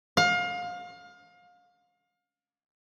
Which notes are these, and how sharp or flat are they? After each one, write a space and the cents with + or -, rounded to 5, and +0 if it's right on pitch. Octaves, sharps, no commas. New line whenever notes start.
F5 +30